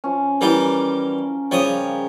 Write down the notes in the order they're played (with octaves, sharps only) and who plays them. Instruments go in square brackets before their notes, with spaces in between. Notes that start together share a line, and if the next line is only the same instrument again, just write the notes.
[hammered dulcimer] F3 C#4
[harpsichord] E3 G3 G4 [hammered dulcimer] A#4
[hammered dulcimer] C#3 G3 [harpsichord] F3 C#5 D#6